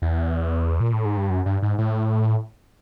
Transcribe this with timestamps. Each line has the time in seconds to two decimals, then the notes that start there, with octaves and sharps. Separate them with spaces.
0.02 E2
0.80 A#2
0.93 A2
1.05 G#2
1.17 G2
1.30 F#2
1.46 G2
1.62 G#2
1.78 A2